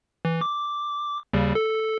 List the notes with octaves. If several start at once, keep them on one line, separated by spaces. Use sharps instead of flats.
E3
D6
D#2 C#3 G3
A4